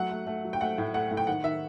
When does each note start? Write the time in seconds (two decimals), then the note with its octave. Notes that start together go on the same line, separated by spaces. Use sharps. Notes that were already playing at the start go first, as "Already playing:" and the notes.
Already playing: F#3 A3 F#5
0.11 A3
0.27 A3
0.45 F#3
0.53 G5
0.61 A3 F#5
0.78 A2
0.94 A3 F#5
1.11 A2
1.17 G5
1.27 D#3 F#5
1.44 D#3 E5